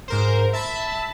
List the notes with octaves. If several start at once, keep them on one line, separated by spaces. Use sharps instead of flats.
G#2 A#4 C5
E5 A5 B5